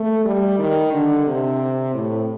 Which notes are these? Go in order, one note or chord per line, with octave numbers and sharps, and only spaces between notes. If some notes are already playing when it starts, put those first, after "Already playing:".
Already playing: A3
G3
D#3
D3
C3
A2